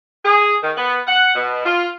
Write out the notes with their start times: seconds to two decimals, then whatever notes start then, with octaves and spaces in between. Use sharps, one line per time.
0.25 G#4
0.63 D#3
0.78 B3
1.07 F#5
1.36 B2
1.66 F4